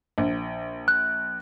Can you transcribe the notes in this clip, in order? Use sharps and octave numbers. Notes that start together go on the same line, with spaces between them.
A#1
F#6